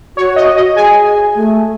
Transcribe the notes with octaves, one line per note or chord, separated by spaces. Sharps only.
F#4 C#5
D#5
D#5
G#4 G#5
A3